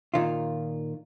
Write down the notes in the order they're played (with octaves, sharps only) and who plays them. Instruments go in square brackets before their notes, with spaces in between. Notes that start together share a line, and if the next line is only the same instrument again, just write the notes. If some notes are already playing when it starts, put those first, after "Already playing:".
[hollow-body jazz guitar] A#2 D#3 F4